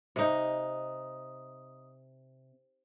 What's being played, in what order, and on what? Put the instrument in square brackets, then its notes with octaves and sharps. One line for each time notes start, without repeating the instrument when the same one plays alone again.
[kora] C3 D#4